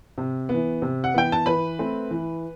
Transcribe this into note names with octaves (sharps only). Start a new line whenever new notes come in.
C3
B3
E3
C3
F#5
E3 B3 G5
A5
E3 B4 B5
A3 C4
E3